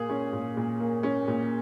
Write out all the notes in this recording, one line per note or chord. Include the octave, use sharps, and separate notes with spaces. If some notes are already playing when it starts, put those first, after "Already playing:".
Already playing: A#2 A#3 G#4
C#4
A#2
A#2
A#3
C#4
A#2